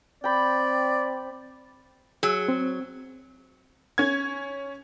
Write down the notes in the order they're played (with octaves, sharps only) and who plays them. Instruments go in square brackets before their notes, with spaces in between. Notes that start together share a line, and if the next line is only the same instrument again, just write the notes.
[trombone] C4 [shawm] D5 [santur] G5 B5
[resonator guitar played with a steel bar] F#3 [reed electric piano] G#4
[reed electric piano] C4
[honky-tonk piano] C#4 G#6